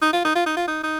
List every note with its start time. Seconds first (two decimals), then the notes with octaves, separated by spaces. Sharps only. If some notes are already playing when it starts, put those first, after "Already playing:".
0.02 D#4
0.13 F4
0.24 D#4
0.35 F4
0.46 D#4
0.57 F4
0.68 D#4
0.83 D#4